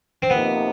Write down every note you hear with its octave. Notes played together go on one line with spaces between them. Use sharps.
C4
C3 F3 A#3 B3 D#4